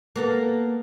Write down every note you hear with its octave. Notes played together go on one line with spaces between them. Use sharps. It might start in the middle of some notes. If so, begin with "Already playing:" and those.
A#3 B3 A4